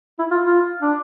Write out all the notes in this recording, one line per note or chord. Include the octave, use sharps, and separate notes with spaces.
E4
F4
F4
D4